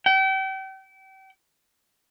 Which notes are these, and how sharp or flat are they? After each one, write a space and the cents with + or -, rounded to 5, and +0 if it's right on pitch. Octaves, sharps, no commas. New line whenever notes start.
G5 -35